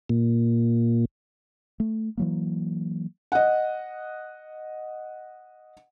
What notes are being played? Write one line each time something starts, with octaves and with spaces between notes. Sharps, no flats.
A#2
A3
E3 F#3 A#3
D#5 F#5